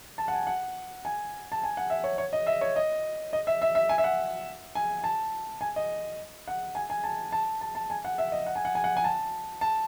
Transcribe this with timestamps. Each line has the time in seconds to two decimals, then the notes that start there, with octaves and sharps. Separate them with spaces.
0.18 A5
0.28 F#5
0.33 G#5
0.47 F#5
1.05 G#5
1.52 A5
1.64 G#5
1.77 F#5
1.90 E5
2.04 C#5
2.18 C#5
2.33 D#5
2.47 E5
2.61 C#5
2.76 D#5
3.33 D#5
3.47 E5
3.62 E5
3.75 E5
3.89 G#5
3.98 E5
4.04 F#5
4.75 G#5
5.04 A5
5.61 G#5
5.76 D#5
6.48 F#5
6.75 G#5
6.90 G#5
7.04 A5
7.32 A5
7.61 A5
7.75 A5
7.90 G#5
8.05 F#5
8.18 E5
8.32 D#5
8.46 F#5
8.56 G#5
8.65 F#5
8.75 G#5
8.84 F#5
8.97 G#5
9.04 A5
9.61 A5